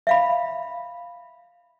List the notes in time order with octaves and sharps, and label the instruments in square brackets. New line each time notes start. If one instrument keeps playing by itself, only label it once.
[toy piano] E5 F5 B5